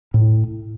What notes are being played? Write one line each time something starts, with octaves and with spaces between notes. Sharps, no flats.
A2